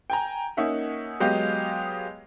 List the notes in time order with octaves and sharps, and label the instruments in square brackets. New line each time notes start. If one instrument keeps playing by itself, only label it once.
[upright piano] G5 G#5 A#5
A#3 C#4 D#4 E5 F#5
F#3 G#3 B3 G4 D#5 F5